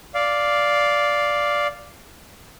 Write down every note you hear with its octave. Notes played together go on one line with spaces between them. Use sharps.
D5 F5